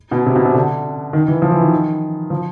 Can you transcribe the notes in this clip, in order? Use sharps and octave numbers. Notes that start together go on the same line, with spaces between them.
B2
C3
B2
C3
D3
D#3
E3
F3
E3
D#3
F3